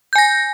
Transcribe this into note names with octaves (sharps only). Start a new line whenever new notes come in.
G#5 G6 A#6